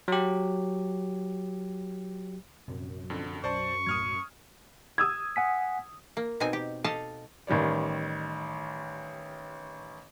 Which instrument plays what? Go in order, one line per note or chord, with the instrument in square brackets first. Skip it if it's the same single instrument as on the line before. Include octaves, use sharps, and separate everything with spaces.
[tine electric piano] F#3 G4
[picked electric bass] A#1 C3 [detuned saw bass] F#2
[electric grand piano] F2 D3
[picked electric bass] B1 [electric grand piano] C5 D5 A5 [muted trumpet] C#6
[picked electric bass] B1 A2 F#3 [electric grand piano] D#6 F6 G#6
[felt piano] D#6 E6 G#6
[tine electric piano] F#5 G#5 B6
[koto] A#3
B2 C4 D#4 G#5
G4
G4 A4 D#5 F5 A5
[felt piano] A1 D#3 G3 C#5 D5